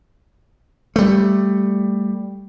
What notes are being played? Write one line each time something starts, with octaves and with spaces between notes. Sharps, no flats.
G3 A3